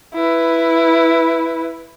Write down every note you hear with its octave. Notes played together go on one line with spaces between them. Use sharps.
E4 B4